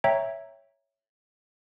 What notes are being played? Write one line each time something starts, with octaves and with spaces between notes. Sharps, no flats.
C#5 E5 G5 A#5